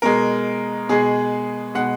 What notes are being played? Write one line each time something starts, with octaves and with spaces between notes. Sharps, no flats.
B2 G#3 A#4
B2 G#3 G#4
B2 G#3 F#5